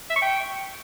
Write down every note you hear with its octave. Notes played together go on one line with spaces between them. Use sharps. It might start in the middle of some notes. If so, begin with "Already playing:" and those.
E5
C#6
G5